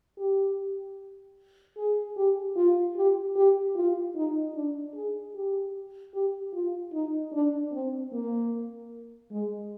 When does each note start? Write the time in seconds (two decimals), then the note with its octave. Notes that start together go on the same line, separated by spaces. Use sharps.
0.18 G4
1.77 G#4
2.17 G4
2.57 F4
2.96 G4
3.36 G4
3.75 F4
4.16 D#4
4.55 D4
4.94 G#4
5.35 G4
6.14 G4
6.54 F4
6.93 D#4
7.33 D4
7.72 C4
8.12 A#3
9.32 G#3